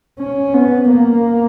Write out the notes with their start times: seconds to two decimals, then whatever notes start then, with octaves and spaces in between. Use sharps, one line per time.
0.19 C#4
0.54 B3
0.91 A#3